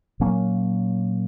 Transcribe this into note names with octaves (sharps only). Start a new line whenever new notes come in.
A#2 F#3 A#3 C#4